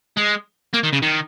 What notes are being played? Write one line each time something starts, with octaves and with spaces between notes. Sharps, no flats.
G#3
A#3
D#3
C#3
D#3